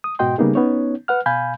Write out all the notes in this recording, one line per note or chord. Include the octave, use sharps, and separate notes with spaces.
D#6
G#2 B2 F#4 D#5 G5 C6
C#3 G3 A#3 B3 D#4 G#4
B3 C#4 D#4 C#5
B4 F#5 F6
B2 F5 G#5 B5 G6